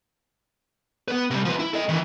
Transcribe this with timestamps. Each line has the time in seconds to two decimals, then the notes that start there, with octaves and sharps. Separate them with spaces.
1.08 B3 B4
1.30 C3 G3
1.45 F3 B4
1.59 E4
1.74 A4 D#5
1.89 D#3 E3